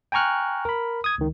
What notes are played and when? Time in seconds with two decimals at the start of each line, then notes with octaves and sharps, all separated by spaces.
0.12 G5 G#5 A#5 C#6 F6 F#6
0.65 A#4 B5
1.04 D#6 G#6
1.18 C#2 D#3